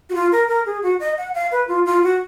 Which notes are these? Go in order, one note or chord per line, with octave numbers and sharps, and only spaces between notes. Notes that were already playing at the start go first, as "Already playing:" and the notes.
F#4
F4
A#4
A#4
G#4
F#4
D#5
F#5
F5
B4
F4
F4
F#4